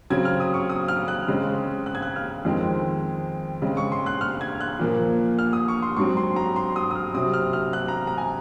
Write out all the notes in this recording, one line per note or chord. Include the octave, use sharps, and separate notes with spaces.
C#3 F#3 C4 G#6
F6
D#6
C#6
D#6
F6
F#6
C#3 G#3 C4
F#6
G#6
F#6
F6
F2 D#3 G#3 C4
C#3 G#3 C4
C#6
C6
F#6
F6
G#6
F#6
A#2 F3 A#3
F6
D#6
C#6
C6
G#2 F#3 C4 C#6
C6
A#5
C6
D#6
D#6
F6
C3 F#3 C4 D#6
F6
F6
F#6
A#5
A#5
G#5